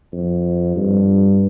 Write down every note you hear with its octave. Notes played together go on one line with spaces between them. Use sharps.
F2
G2